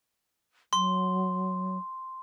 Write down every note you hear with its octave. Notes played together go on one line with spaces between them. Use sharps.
F#3 C6